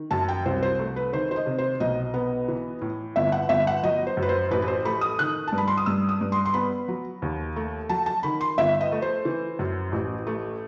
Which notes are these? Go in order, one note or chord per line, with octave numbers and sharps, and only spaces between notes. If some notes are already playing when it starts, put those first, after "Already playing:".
Already playing: D#3
F#2 A5
G5
C2 C5
C5
A3
B4
D#3 C5
C5
D#5
C3
C5
B1 D#5
B3
E3
A2
G1 E5
F#5
G1 E5
F#5
F#3 D#5
C5
F#2
B4
C5
A1 B4
B4
C5
A3 B5
D#6
D#3 F#6
A5
G2
B5
C6
D#6
G2 E6
D#6
G2
C6
C6
B3 B5
F#3
D#2
A3
F#3 A5
A5
D#3 B5
C6
G1 E5
D#5
A3
C5
E3
F#2
A1
A3